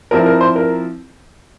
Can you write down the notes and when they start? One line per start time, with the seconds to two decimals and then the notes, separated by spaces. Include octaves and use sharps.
0.11 F3 C4 E4 A#4
0.26 A#4
0.41 C5
0.56 A#4